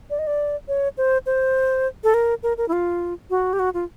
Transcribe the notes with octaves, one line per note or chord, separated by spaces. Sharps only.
D5
D#5
D5
C#5
C5
C5
A4
A#4
A#4
A#4
E4
F4
F#4
G4
F#4
F4